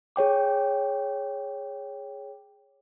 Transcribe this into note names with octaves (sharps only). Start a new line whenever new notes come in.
G#4 C#5 G5 D6